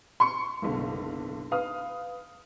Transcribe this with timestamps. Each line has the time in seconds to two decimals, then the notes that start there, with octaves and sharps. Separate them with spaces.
0.20 C6 C#6 C#7
0.62 F#1 B1 D3
1.51 B4 F5 D#6